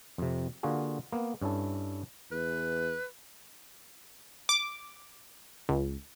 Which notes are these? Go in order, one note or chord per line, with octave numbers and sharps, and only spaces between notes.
F2 C3
D3 A#3 F4 F#4 G#4
A#3 B3
G2 C#4 E4 A4
E2 B4
D6
C#2